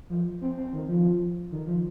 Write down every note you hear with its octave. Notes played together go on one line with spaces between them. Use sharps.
F3
C4
C4
D#3
F3
D#3
F3